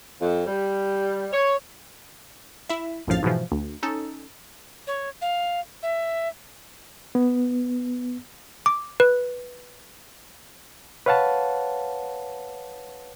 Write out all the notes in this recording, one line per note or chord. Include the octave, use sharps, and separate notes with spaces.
F2
G3
C#5
E4 E5
A#1 F#2 A2 F3 F5 A6
G#2 B2 E3 F3
D2
C#4 D#4 A4
C#5
F5
E5
B3
D6
B4
B4 C#5 F5 F#5 A5